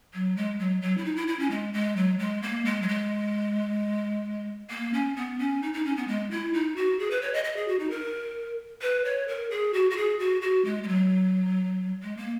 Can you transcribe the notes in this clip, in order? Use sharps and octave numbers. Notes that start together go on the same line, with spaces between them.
F#3
G#3
F#3
F#3
E4
D#4
E4
E4
C#4
G#3
G#3
F#3
G#3
A#3
G#3
F#3
G#3
A#3
C#4
B3
C#4
D#4
D#4
C#4
B3
G#3
E4
D#4
F#4
G#4
B4
C#5
D#5
D#5
G#4
F#4
D#4
A#4
B4
C#5
A#4
G#4
F#4
F#4
G#4
F#4
F#4
G#3
G#3
F#3
G#3
A#3